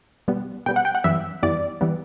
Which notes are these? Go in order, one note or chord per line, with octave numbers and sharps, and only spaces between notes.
B2 G3 B3
B2 G3 B3 G5
F#5
G5
F#5
F#2 E3 G3 B3 E5
F#2 E3 G3 B3 D5
E3 G3 B3